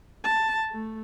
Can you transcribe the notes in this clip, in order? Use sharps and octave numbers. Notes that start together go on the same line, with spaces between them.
A5
A3